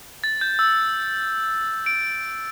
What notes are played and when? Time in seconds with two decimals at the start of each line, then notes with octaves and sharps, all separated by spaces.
0.24 A6
0.41 G6
0.59 E6
1.86 D7